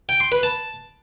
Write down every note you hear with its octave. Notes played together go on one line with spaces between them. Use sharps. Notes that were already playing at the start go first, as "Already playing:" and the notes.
G5
C6
B4
A5